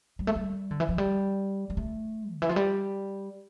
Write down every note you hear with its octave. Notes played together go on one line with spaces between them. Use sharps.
G3
A3
G3
D3
E3
F3
G3
G3
A3
D3
E3
F3
G3